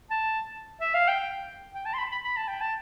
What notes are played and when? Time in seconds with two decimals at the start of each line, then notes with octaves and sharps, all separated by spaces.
0.11 A5
0.81 E5
0.94 F5
1.08 G5
1.74 G5
1.86 A5
1.94 C6
1.98 B5
2.12 B5
2.25 B5
2.37 A5
2.48 G5
2.61 A5